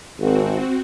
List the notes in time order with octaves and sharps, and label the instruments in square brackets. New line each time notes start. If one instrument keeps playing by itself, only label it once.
[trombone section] G#1 [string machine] C4 F#4